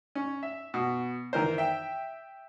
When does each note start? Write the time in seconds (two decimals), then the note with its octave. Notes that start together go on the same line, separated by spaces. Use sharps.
0.15 C#4
0.43 E5
0.74 B2
1.33 D#3 E3 A#4 C5
1.58 E5 G5